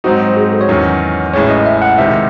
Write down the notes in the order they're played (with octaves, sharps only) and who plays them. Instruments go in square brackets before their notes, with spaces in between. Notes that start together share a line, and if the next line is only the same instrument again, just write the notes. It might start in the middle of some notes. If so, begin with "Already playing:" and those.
[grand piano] G#2 F#3 C4 D#4 [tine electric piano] F#4
[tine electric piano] G#4
F#4
A4
C#5
[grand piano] E2 D#3 F#3 C#4
[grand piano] A1 A2 G#3 C#4 [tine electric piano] C#5
[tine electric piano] D#5
E5
F#5
[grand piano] C#2 C3 D#3 [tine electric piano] E5